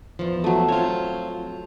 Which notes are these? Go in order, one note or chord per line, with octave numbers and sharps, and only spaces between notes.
E2 F3
F#3 A3
C4 F4 C#5